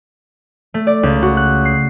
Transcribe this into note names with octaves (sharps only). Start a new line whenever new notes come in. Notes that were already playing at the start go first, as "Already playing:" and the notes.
A3
D5
C#2
F#4
F#6
C7